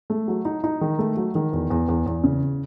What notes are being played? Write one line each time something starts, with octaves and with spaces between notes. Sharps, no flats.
A3
F#3
D#4
D#4
D#3
A3
F#3
D#3
E2
E2
E2
E2
C#3